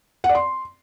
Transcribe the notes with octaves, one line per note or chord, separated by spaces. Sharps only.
F#5
D5
C6